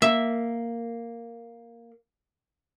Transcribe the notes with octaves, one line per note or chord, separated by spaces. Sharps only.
A#3 E5